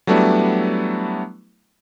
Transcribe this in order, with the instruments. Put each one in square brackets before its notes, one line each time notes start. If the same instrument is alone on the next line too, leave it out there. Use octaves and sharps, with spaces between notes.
[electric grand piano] F#3 G3 A3 B3 D4 E4